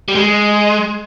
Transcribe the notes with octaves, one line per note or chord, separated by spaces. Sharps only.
G3
G#3